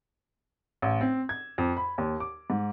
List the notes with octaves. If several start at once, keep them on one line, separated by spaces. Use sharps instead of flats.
A1
C4
G#6
F2
B5
D#2
D6
G#2